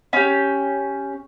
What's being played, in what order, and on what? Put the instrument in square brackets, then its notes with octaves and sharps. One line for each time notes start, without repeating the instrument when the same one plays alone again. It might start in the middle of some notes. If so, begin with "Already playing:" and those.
[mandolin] C#4 G4